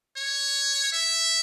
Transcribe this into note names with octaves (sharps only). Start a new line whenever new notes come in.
C#5
E5